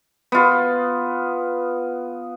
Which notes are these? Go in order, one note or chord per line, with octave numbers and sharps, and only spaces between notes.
B3 F4